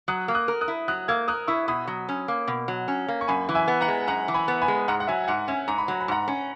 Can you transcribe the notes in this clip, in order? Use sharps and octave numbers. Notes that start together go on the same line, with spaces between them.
F#3 D#6 F#6
A#3
D#6 F#6
A#4
D#6 F#6
E4
F#3 D#6 F#6
A#3 E6 G#6
A#4 D#6 F#6
E4 C#6 E6
B2 B5 D#6
F#3
C#4
A#3
B2
F#3
C#4
A#3
C#6
F#2 G#5 B5
E3
E5 G#5
B3
F#5 A#5
G#3
F#2 F#5 A#5
E3
G#5 B5
B3
G#5 B5
G#3
G#2 F#5 A#5
F#5
F#3 E5 G#5
G#5
G#2 F#5
C#4 E5 G#5
G#2 A#5
B5
F#3 A#5
B5
G#2 F#5 A#5
C#4